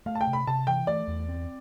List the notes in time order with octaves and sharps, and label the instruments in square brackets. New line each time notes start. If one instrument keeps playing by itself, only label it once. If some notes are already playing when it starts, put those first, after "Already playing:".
[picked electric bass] A3 [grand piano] F5
[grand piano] A5
G5
[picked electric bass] C3
[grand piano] B5
[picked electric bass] C3 [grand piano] A5
[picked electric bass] E3 [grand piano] G5
[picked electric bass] A3 [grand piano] D5
[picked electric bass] E2
C4